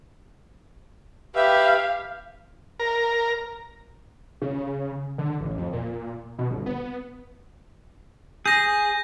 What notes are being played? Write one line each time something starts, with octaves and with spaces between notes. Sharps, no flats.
G4 B4 E5 F5
A#4
C#3
D3
A1
F2
A#2
B2
G1
B3
G#4 G6 A#6